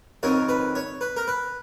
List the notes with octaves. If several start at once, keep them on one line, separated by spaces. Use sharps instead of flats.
F2 D#3 F#3 C#5
B4
C#5
B4
A#4
B4